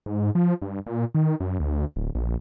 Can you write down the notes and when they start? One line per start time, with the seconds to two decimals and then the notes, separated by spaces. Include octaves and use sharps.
0.06 G#2
0.35 F3
0.62 G2
0.86 A#2
1.15 D#3
1.40 F#2
1.60 D2
1.96 D1
2.15 A#1